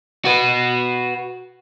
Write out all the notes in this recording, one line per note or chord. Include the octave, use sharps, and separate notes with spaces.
F#4 B4